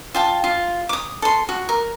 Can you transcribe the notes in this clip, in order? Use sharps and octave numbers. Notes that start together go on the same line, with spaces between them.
F4 G5 A5
F4
D6 D#6
A4 C6
F#4
A#4